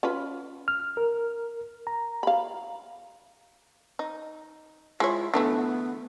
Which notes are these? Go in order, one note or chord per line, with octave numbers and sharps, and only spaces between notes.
C#4 F4 B4
F6
A#4
A#5
F5 B5
D#4
G#3 E4 F4 C#5
D3 E3 A3 B3